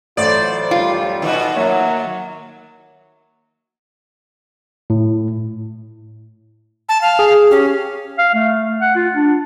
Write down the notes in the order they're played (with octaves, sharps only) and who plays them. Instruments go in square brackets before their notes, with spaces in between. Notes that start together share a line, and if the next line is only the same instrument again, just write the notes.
[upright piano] A1 A3 [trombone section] F#3 F4 C5 [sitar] D5
[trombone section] F#2 G3 [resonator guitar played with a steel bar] F4
[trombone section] B2 [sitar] D#3 F#4
[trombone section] F#3 [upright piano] A#3 C#5 E5
[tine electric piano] A2
[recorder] A5
F5
[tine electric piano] G#4
[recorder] C#4 [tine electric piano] G4
[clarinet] F5
A3
F#5
F4
D4